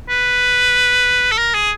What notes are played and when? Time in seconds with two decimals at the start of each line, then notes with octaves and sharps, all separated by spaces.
0.10 B4
1.32 A4
1.38 A#4
1.54 G#4